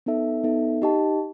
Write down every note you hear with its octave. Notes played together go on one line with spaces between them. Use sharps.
B3 D#4 A4 E5
B3 D#4 A4 E5
D#4 G4 D#5 A5